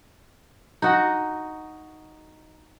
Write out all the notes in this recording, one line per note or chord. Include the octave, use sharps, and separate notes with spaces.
D#4 F#4